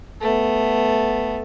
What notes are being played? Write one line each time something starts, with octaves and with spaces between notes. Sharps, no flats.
A3 B3